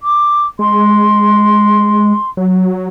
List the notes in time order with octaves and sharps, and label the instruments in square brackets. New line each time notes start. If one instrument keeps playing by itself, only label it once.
[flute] D6
[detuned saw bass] G#3 [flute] C6
[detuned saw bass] F#3